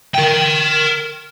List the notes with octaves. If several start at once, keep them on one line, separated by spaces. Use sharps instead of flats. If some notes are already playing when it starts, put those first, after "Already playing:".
A#4 G5